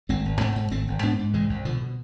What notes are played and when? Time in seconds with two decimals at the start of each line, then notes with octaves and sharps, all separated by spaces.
0.09 G#1 A3 C4
0.25 G#1
0.41 G#2 A3 C4
0.56 G#2
0.71 G#1 A3 C4
0.88 G#1
1.02 G#2 B3 D4
1.19 G#2
1.33 C2 E3 G#3
1.49 C2
1.65 B2 D3 F3
1.81 B2